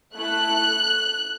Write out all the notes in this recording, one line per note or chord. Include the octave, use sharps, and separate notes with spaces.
A3 E4 A4 F#6